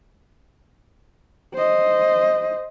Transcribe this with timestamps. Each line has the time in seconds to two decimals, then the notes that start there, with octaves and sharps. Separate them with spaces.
1.54 C5 D#5